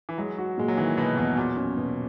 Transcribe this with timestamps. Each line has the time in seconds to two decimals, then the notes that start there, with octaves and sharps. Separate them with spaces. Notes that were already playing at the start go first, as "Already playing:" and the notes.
0.09 E3
0.18 F#3 G#3
0.38 F#4
0.58 A#2 G#3
0.68 F#3
0.77 D#3 E3
0.98 B2 B3
1.17 E2 B2
1.37 A#2 F#3
1.56 C#4
1.77 B2